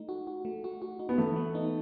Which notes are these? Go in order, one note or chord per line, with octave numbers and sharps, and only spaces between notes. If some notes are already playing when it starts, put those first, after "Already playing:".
Already playing: A3 D#4
F#4
F#4
A3
F#4
F#4
D#4
B3
E3 A3
B3
D#4